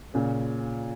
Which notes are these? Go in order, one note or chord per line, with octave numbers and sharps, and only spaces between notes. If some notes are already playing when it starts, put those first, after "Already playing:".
A#2 C#3